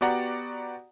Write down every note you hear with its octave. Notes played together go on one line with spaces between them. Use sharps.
B3 F#4 G4 D5 F#5 A#5